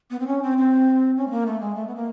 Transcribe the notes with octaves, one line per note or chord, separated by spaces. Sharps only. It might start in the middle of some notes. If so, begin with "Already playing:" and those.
B3
C4
C#4
C4
C4
C#4
A3
A#3
A3
G#3
A3
B3
A#3